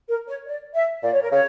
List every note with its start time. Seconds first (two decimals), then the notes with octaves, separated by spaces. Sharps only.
0.09 A#4
0.28 C#5
0.47 D5
0.74 E5
1.03 A#2 D5
1.12 C#5
1.22 A#4
1.31 C#3 C#5